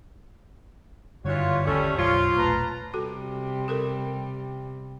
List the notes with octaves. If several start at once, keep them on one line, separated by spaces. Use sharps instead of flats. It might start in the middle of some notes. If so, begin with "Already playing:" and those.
F#1 G2 D3 E3 F#3 G3 F4 C#5
G#1 D#2 D3 G3 A3 C#4
F#1 B1 F#2 F3 F4 C#5
E1 A#1 A3 B4 A5 A#5
C3 G3 F#4 A4
G4 A4 A#4